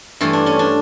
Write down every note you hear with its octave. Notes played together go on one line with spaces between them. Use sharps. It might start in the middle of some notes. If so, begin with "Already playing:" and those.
G2 E3 A3 F4
D4
C#4
D4